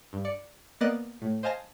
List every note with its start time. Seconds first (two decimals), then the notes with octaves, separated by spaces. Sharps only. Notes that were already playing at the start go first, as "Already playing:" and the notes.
0.13 G2
0.25 D5 C#7
0.81 A#3 B3 D5 D#5 F#6 A6
1.22 A2
1.43 C5 D#5 F5 G#5 A5 A#6